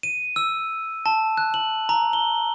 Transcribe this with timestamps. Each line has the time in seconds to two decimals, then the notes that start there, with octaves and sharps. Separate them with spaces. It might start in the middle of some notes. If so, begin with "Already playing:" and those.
0.03 D#7
0.36 E6
1.06 A5
1.37 F#6
1.54 F#7
1.89 A#5
2.13 G7